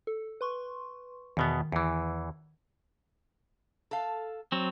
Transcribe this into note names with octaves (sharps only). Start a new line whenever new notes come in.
A4
B4 C6 C#6
E2 B2 D#3 B3
E2 E3
A4 F5
F#3 C4